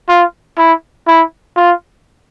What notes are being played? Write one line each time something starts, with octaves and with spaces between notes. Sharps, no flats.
F4
E4
E4
F4